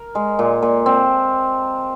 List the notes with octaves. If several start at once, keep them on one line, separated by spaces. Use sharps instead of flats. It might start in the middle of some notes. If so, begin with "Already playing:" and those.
Already playing: A#4
G#3
A#2
A#2
C4